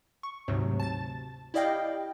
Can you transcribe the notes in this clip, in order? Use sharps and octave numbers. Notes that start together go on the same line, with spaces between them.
C#6
D2 G#2 C3 F#3
A5 A6
E4 G4 D5 D#5 F5 G5